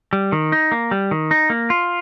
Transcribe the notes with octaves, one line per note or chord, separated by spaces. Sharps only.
G3
D#3
D#4
A#3
G3
D#3
D#4
A#3
F4